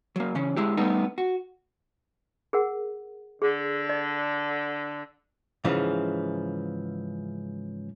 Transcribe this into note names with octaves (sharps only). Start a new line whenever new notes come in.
F#3 A#3
C#3 E3 C#4
G#3 E4 G4
G3 A3 B3 D#4
F#4
G#4 A#4 F#5
D3 G#4
D5
G#2 C#3 E3 F3